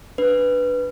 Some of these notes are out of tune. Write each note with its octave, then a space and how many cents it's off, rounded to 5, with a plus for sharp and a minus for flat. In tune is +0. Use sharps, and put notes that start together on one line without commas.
D4 +0 B4 +0